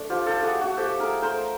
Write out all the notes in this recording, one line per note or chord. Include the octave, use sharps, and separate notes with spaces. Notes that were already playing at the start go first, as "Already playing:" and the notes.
Already playing: A3 D4
F3 F4 G4
G4 A4
A3
F#4 G#4
A3
F#4
F3 G4 A4
A3 G#4 A#4
A3 A#4 C5